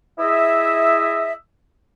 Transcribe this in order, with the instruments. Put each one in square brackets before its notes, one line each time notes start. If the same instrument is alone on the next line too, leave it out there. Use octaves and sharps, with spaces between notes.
[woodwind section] E4 G#4 D#5 E5